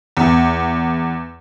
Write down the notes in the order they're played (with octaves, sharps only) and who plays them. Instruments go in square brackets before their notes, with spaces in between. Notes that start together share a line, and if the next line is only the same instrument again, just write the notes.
[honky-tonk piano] E2